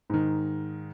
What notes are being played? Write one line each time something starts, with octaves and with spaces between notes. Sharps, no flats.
G#2 D#3